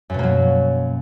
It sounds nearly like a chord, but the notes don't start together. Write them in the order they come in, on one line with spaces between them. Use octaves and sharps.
F#2 B2 A#3 F#3